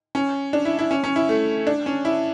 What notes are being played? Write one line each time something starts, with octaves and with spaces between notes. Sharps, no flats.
C#4
D4
E4
E4
C#4
C#4
E4
A3
D4
C#4
E4